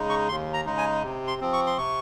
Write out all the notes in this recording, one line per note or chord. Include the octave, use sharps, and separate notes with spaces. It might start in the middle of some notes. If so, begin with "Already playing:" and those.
Already playing: C#3 G#3 D#4
C#6
D#2 C6
A#5
C#3 G#3 D#4
G#5
C3
C6
F3 C4
C#6
C6
C3 C#6